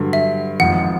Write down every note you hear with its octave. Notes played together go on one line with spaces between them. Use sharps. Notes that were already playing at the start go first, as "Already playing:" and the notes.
Already playing: G2 D3 F#3
E5
G#1 G#2 F3 F#5